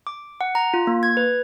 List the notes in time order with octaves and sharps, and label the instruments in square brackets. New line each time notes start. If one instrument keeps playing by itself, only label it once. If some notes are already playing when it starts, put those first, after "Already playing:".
[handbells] D6
F#5
A#5
F4
A#3
G#6
B4